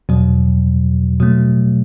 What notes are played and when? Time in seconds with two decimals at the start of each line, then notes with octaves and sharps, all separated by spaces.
0.09 E2 B2 F#3
1.20 B2 F#3 A3